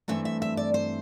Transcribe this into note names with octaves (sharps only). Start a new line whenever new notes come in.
G2 E3 A3 C4 E5
E5
E5
D5
C5